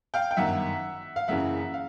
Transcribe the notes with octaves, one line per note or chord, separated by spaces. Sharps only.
F5 G5
G5
G1 F#2 D#3 E5 F#5
F5
F#1 F#2 C#3 E3 E5 F#5
F5